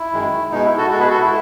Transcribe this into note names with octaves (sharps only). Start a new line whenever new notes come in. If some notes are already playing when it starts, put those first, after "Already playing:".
Already playing: E4
F#2 D#3 G#3
B2 G#3 D#4
E4
F#4 A4
B2 G#3 F#4 A4
G#4 B4
F#4 A4
E4